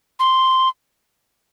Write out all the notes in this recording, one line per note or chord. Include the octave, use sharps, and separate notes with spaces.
C6